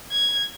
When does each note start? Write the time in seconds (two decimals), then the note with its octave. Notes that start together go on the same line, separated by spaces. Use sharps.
0.12 G#6